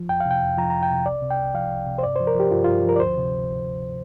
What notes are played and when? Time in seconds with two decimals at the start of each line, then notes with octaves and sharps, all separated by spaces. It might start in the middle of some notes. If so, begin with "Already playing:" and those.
Already playing: F3
0.09 F2 G5
0.20 F5
0.26 C3 G5
0.42 F2
0.58 F3 A#5
0.70 F2 A#5
0.83 G5
0.91 C3
1.06 C2 D5
1.22 C3
1.31 G5
1.39 C2
1.54 F3 F5
1.71 C2
1.87 C3
1.98 C5
2.03 G2 D5
2.16 F3 C5
2.27 A#4
2.35 F3 G4
2.51 G2 F4
2.64 G2 F4
2.85 F3 A#4
2.96 D5
3.00 D2 C5
3.17 C3